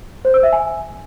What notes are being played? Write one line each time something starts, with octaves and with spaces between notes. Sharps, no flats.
C5
E6
E5
G#5